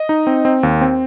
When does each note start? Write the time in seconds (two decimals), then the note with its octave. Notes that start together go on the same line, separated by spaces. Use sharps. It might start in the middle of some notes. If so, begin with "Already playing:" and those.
Already playing: D#5
0.09 D#4
0.27 C4
0.45 C4
0.63 D#2
0.81 C4